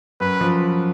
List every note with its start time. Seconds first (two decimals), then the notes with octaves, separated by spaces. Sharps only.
0.21 F#2 B4
0.41 F3